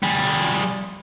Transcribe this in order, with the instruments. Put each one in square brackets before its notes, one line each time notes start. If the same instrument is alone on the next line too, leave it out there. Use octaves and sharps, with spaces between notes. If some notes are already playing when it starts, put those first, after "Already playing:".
[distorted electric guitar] G3 G#4